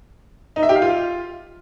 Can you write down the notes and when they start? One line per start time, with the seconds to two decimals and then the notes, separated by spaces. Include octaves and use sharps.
0.56 D#4
0.63 E5
0.69 G4
0.76 F5
0.82 F4